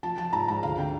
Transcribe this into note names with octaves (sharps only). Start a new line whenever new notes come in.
F3 A5
F3 A5
G#2 A#5
G#2 A#5
D2 F5
D3 G5